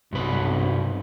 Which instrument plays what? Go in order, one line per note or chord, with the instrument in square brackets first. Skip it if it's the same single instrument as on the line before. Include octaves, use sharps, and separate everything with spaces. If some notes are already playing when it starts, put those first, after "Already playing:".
[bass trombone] B1 [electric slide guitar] G2 C3 B4